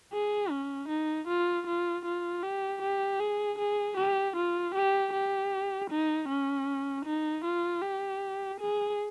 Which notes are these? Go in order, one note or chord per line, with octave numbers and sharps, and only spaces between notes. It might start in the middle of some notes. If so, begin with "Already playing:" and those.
G#4
C#4
D#4
F4
F4
F4
G4
G4
G#4
G#4
G4
F4
G4
G4
D#4
C#4
D#4
F4
G4
G#4